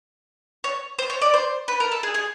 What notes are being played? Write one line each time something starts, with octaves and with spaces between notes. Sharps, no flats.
C#5
C5
C#5
D5
C5
B4
A#4
A4
G#4
G#4